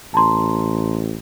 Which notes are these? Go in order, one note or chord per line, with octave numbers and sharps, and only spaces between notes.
A1 A5 A#5 C6